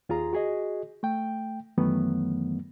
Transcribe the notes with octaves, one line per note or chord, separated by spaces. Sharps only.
D#2 F4 G#4 A#5
F#4 G#4 D#5
A3 G5
F#2 D#3 E3 F#3 A3 B3